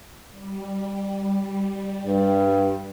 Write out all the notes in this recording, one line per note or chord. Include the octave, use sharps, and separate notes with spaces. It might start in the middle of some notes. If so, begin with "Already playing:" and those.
G3
G2